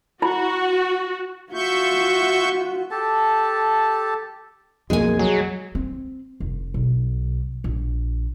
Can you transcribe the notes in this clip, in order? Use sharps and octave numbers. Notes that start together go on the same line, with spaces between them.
E4 F#4 B5
F4 F#4 E5 C#6 G6
G4 A4 A5
B1 F2 G#3 A#3 G#5
F#3 G#4
C4
F1
B1
A#1